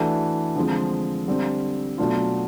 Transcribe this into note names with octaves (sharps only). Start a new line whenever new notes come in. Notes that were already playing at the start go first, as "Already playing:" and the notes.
Already playing: E3 A3 D4 F#4
D3 F3 G#3 C4
D3 G3 C4
B2 F#3 A3 D4 F4